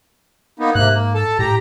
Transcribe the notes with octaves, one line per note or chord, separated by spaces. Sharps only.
A#3 B3 D#4
G#2 C3 A#3 F#6
A#3
A4 A5
A2 G4 A#5